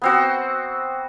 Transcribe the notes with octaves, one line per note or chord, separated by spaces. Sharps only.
B3 C4 F#4